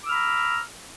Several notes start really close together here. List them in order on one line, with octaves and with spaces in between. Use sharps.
D6 E6 F6 B5 A#5